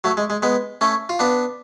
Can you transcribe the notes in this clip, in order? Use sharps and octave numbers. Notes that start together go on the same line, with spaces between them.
F#3 A3
G#3
G#3
G#3 B3
A3 C#4
F4
B3 D4